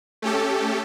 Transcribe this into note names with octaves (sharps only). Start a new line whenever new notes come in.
A3 C#4 G4 A4